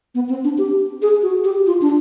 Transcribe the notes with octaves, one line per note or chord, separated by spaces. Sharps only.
B3
C4
D4
G4
G#4
F#4
G4
F4
D4